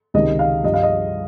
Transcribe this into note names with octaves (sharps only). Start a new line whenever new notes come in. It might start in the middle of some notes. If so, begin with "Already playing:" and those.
C#2 C3 D#3 D#5
F5
G2 F3 D#5
F5
D#5